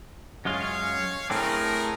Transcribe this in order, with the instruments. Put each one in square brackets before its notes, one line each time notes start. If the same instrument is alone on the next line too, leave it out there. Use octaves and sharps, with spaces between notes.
[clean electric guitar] F#2 G#3 F4 [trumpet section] C#5 F5
[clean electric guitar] A2 C4 D4 [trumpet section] A3 G#4 A#4